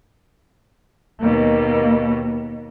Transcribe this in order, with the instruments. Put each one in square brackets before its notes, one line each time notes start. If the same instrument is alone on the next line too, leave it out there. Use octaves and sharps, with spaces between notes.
[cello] D#2 B2 [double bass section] A#3